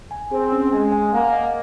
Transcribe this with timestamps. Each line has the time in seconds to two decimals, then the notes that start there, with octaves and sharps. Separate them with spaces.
0.11 G#5
0.31 C4 G#4
0.52 C#4
0.72 G#3 G#5
0.92 G#5
1.13 A#3 F#5
1.32 D#5